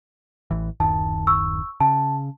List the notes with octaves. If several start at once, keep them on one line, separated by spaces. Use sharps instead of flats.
A1 E3
D1 F#2 D#3 A5
C#6 E6
C#3 A5